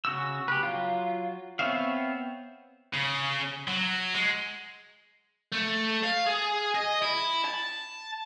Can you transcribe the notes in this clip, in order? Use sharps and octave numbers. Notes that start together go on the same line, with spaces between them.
C#3 F#4 E6
G4 B4
F#3 F4
B3 C4 C#5 E5 F5
C#3
F#3
G#3
A3
F5
G#4
D#5
E4
A5